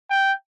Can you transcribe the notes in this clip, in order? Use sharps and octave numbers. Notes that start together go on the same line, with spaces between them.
G5